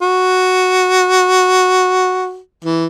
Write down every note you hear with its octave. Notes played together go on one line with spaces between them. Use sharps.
F#4
E3